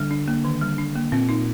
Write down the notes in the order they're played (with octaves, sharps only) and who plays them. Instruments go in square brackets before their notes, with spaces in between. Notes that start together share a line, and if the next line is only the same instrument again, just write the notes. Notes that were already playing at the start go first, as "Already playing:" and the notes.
Already playing: [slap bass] D3 [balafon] G3
[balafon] D4
A#3
D#3
G3
D4
A#3
[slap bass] A#2 [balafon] C4
[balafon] D#4